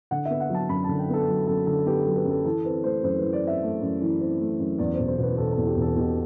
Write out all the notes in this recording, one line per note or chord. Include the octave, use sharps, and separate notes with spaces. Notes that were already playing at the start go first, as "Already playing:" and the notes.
D3 F#5
B3 E5
F#5
F#3 A5
F#2 B5
D3 A5
G5
B3 A4
F#3
F#2 A4
D3 A4
B3 G4
A4
F#3
B4
F#2
A4
E3 A4
C4 B4
A3 C5
F#2 C5
E3 B4
D5
C4 E5
A3
F#2
E3
C4
A3
F#2
E2 D5
E1 C5
C5
B2
B4
E1 A4
E2 A4
G4
E1
A4
B2 G4